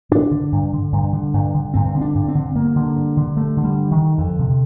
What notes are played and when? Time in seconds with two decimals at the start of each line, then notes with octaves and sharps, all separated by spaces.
0.11 G2 D4
0.31 D3
0.52 G2
0.73 D3
0.92 G2
1.13 D3
1.34 G2
1.54 D3
1.74 G2 C4
1.94 D3
2.01 D4
2.15 G2
2.28 C4
2.35 D3
2.55 G2 A#3
2.76 D3
2.97 G2
3.17 D3
3.37 G2 A3
3.57 D3
3.64 G3
3.78 G2
3.91 D#3
3.98 D3
4.18 F2 D3
4.39 C3